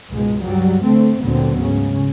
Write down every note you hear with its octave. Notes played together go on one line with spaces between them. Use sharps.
C#2 G#2 B2 G#3
G2 F#3 G3
D3 A3 C4
D2 A#2 D3 F#3 B3 C4
G#2 C#3 C#4